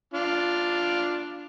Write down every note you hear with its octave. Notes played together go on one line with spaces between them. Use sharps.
D4 F4